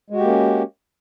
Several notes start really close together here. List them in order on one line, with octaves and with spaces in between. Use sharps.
G#3 F#4 G4 A#3 C#4